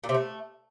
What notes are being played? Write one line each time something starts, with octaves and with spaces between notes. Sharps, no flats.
A#2
C3
A3